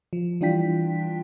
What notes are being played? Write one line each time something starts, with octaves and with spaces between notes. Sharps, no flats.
F3
E3 G3 D4 F4 G5 B6